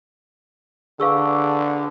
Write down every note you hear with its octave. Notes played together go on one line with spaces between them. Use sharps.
D3 G#4 B4 F5 C#6 D6 E6